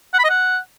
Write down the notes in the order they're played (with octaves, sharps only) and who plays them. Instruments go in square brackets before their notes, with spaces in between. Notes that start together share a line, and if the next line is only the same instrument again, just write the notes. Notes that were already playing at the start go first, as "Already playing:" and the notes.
[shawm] F#5
B5
D#5
F#5